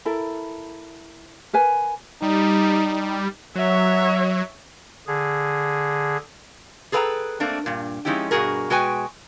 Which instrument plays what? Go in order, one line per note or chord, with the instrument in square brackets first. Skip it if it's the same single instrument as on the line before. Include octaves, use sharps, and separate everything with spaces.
[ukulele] E4 A4 A#4 B5
A#4 B4 G#5
[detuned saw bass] G3 [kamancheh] D#4
[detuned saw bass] F#3 [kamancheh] C#5 E5
[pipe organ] D3 G#4
[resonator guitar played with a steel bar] G#4 A4 B4 F5 G5 A#5
A3 A#3 C4 D4
G2 A#2
F3 G#3 C#4 D#4 E4 G4
G2 B2 D#3 F#4 G#4 A#4
B2 G#3 F#4 B4 G5 G#5